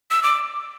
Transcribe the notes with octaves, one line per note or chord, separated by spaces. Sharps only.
E6
D6